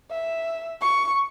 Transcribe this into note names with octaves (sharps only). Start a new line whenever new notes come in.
E5
C#6